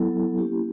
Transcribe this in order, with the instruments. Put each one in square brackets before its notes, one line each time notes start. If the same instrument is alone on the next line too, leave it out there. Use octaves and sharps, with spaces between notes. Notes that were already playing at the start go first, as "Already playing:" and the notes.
Already playing: [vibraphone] F#3 B3 E4 A4
A#3 C#4 E4 G4